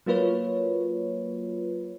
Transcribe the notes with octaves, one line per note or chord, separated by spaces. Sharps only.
F#3 A#3 F4 B4 C#5